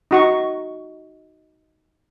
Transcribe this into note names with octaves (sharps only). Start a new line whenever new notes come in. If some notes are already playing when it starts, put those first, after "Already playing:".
D#4 F#4 C#6